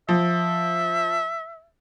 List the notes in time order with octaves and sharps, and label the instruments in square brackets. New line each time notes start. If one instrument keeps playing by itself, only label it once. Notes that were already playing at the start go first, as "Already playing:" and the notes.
[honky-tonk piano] F3 [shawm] E5